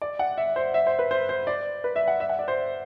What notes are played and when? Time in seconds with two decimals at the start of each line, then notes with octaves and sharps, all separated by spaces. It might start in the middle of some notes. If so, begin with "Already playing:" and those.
0.02 D5
0.19 F#5
0.38 E5
0.56 C5
0.74 E5
0.87 C5
0.99 B4
1.11 C5
1.29 C5
1.47 D5
1.84 B4
1.96 E5
2.08 F#5
2.20 E5
2.29 F#5
2.39 D5
2.48 C5